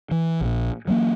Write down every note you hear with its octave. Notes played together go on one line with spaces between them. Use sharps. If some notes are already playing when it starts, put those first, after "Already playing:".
E3
A#1 A#2
E3 F#3 A3 A#3